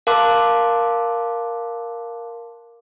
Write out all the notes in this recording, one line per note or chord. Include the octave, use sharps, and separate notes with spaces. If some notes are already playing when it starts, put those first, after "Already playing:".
A#4 F5 A5 C6 D6 F#6